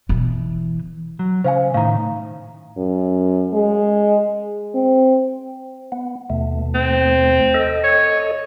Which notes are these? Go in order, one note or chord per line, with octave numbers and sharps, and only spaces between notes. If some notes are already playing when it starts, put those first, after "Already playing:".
B2 E3
F#3
C#3 C5 F5 G#5
A2 D#3 F5 A#5
F#2
G#3
C4
B3
D#2 B2 A3
C4
A4 D#5
C#5